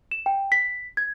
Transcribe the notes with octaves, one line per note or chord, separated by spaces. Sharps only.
E7
G5
B6
G#6